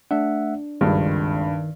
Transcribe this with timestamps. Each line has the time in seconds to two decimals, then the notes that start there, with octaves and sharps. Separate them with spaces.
0.11 A3 D4 E5 F#5
0.81 G#1 C#2 G2 D#3